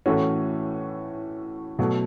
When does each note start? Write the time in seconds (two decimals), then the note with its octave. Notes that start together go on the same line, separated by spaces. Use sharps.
0.06 A2 E3 A3 C#4 F#4
1.79 B2 F#3 A3